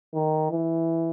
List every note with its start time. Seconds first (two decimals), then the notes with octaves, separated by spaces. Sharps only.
0.14 D#3
0.51 E3